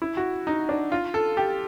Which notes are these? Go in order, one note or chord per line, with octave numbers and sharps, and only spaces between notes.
E4
F#4
D#4
D4
F4
A4
G4